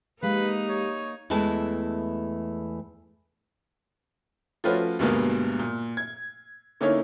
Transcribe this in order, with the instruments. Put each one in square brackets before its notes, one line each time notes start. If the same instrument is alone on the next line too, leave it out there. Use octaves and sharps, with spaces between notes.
[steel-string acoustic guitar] G#3 F5 [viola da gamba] A#3 D#4 [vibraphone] G4 [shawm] B4
[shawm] C#5
[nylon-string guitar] E2 E3 G#3 A3 A5
[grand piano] F3 A3 C#4 F4 F#4 B4
D2 G2 B2 G#3 A#3 B3
A#2
G#6
D3 A#3 C#4 D#4 E4 C#5